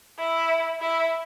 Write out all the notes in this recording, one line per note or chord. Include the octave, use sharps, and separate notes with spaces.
E4
E4